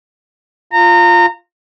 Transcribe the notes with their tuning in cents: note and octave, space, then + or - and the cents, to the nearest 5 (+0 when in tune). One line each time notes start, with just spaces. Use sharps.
F4 +0 A#5 -25